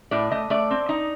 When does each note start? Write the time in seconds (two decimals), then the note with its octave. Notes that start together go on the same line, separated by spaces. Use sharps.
0.11 A2 D5
0.31 A3 D#5
0.50 A3 D5
0.71 C4
0.89 D#4